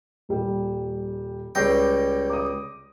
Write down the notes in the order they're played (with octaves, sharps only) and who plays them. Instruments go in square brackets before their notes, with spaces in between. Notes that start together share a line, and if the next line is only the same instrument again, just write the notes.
[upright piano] D#1 G3
[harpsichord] C#2 G3 G5 [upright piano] A#6 C7
[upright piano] D6 D#6